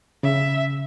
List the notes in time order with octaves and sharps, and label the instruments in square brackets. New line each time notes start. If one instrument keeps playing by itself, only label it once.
[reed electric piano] C#3 [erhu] E5